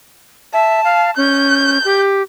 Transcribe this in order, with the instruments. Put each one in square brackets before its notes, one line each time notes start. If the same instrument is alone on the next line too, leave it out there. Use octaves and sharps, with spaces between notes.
[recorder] E5 [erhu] A5
[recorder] F5
[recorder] C#4 [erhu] G6
[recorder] G4